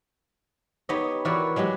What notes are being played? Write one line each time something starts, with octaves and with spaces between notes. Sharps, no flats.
B3 D#4 G4 C#5 D#5
E3 F#4 A#4 B4 C#5 D5
F#3 G#3 F#4 G4